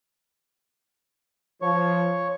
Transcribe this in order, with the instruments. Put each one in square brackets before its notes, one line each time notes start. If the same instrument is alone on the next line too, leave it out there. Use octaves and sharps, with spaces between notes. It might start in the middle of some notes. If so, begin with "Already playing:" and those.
[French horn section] F3 [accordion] C#5 C#6